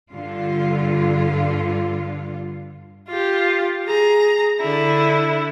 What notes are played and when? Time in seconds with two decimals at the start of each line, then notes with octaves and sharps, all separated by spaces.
0.11 G2 D3 F4
3.08 F4 G4
3.85 G#4 A#5
4.60 D3 E4